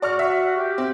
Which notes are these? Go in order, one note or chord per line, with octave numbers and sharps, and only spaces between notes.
F#4 D5 C#6 F6
E5
G4
C4